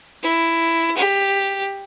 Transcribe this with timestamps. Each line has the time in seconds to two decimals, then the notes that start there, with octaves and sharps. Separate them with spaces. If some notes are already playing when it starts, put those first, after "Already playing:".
0.23 E4
0.97 G4